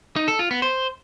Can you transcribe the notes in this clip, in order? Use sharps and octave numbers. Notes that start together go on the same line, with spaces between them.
D#4
A4
F4
B3
C5